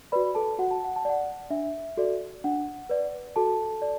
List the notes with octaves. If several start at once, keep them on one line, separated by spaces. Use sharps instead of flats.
F#4 B4 D5 B5
A4 A5
F#4 F#5
A5
F#5
A5
D5 F#5
D4 E5
F#4 A4 D5
D4 F#5
B4 D5
F#4 A4 A5
D5